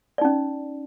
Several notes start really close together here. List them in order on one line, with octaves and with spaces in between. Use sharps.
D5 D#4 C#4